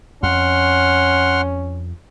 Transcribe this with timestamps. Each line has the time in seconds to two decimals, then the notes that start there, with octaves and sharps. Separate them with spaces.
0.23 F2 C#4 F#5 C6 F6